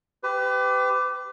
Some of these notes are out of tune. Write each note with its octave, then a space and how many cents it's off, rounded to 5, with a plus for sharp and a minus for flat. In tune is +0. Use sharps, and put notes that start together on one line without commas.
G4 -5 B4 +35